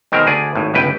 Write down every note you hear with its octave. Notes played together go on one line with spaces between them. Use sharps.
B2 D#3 G#3 C4 A#4
D2 G#4 D5
G#1 A2
G1 C#2 B4 G5